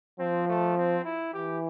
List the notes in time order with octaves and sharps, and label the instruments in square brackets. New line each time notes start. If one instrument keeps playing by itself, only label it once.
[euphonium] F3 [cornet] C4
[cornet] A3
C4
E4
[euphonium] E3 [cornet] G4